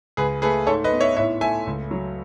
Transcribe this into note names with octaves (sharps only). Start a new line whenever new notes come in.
C#2 G#4 B4
A3 G#4 B4
G#2 A4 C#5
B4 D#5
B3
C#5 E5
A2 C#5 E5
A3 E5 G#5
C#2
F#3